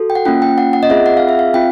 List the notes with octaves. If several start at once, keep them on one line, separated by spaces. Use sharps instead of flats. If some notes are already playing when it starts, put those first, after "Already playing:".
Already playing: F#4 A4
G5
F#5
A#3 C#4 F4 G5
G5
F#5
F#5
D#5
C4 F4 G#4 E5
F#5
F5
E5
F5
C4 F4 G5